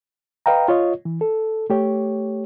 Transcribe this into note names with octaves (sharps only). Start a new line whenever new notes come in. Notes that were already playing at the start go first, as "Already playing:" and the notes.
B4 D#5 F5 G5 A#5
F4 C#5 D#5
E3
A4
A3 G4 C#5